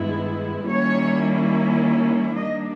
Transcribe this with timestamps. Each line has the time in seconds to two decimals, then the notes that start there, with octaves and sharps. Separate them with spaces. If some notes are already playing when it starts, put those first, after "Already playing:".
Already playing: G2 D#3 G#3 B3 E4
0.68 D#3 G3 A#3 C#4 E4 C#5
2.37 D#3 G3 A#3 D4 D#5